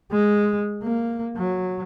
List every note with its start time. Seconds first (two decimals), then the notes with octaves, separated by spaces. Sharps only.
0.12 G#3
0.84 A#3
1.37 F#3